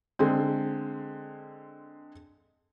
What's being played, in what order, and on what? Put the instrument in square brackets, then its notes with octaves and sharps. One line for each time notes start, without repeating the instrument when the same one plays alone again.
[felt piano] D3 G#3 C4